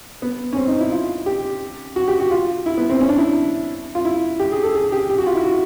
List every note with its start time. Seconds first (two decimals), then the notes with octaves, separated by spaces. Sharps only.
0.22 B3
0.53 C#4
0.57 C4
0.68 D#4
0.80 E4
0.92 F4
1.26 G4
1.96 F#4
2.08 G4
2.20 F#4
2.31 F4
2.66 E4
2.77 B3
2.90 C4
3.01 C#4
3.09 D4
3.18 E4
3.95 F4
4.05 E4
4.40 G4
4.52 G#4
4.63 A4
4.75 G#4
4.92 G4
5.10 G4
5.18 F#4
5.26 F4
5.35 E4
5.44 F#4